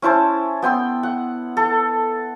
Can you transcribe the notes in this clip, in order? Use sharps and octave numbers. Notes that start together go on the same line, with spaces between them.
C#4 E4 C5 A5
B3 G5 C6 E6
F#5
A4